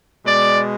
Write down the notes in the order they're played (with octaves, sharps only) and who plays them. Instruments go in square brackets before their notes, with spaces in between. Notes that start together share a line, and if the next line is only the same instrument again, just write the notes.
[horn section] B2 G#3 D5